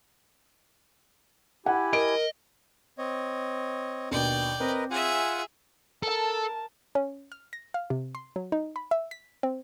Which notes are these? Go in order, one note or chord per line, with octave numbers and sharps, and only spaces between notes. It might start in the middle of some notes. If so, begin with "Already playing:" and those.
E4 G4 F#5 G#5
A#4 D#5 D7
C4 C#5 D#5
D#2 B2 D4 D5 G5
C4 A#4 B4 D#5
F4 G#4 E5 F#5 G#5
A4 A#4 A5
C#4
F6
A#6
F5
C3
C6
F#3
D#4
B5
E5
B6
C4